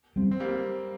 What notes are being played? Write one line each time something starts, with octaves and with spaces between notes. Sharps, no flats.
G3 C4
C4
G3 A#3